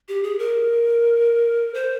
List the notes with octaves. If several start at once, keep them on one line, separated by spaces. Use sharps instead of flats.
G4
G#4
A#4
C5